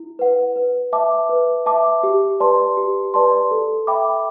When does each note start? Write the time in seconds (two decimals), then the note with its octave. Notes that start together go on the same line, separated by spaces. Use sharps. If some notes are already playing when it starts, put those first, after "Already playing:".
Already playing: E4
0.19 B4 F#5
0.56 B4
0.93 E5 A5 D6
1.29 B4
1.66 E5 A5 D6
2.03 G4
2.40 B4 D5 A5 C6
2.77 G4
3.14 B4 D5 A5 C6
3.51 A4
3.87 E5 G5 B5 D6